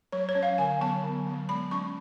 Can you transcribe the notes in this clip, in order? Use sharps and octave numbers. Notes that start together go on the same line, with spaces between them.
F#3 C#5
C#5
C#4
F5
D3 G#5
F#3 B3 A5
D3
F#3 B3
G#3 B5
C#4 C#6